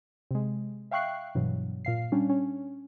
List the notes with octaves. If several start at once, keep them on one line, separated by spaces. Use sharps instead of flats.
C3 G#3
E5 F5 G5 C#6 F#6 C7
G2 B2 E3 F#3
A#2 F5 C7
G3 C#4 D4
C#4